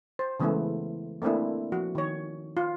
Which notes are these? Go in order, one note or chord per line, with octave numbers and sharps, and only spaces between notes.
C5
C#3 E3 G#3 A3 B3 E4
A3 A#3 C4 D4 E4
F3 F#4
D#3 C#5
F4